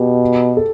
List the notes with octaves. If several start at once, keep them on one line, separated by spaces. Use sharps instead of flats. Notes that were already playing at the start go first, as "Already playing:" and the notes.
Already playing: B2 G4
A4